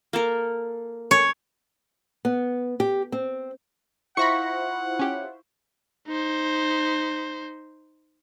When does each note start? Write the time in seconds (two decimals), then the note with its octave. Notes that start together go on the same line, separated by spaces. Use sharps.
0.13 A#3 A4 A#4
1.11 C#5
2.25 B3
2.80 G4
3.12 C4
4.17 E4 F4 C5 F#5 B5 C#6 A#6 C#7
4.99 C#4 G4
6.08 D#4 C5